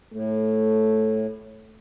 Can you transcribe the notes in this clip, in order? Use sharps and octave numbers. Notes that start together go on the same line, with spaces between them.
A2 A3